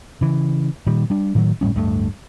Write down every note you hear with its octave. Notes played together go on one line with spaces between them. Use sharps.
C#3 E3
A#2 D#3 G3
G3 D4
A2 D#3 E3 F#3
F#1 A2 G3 C#4
D1 G2 A3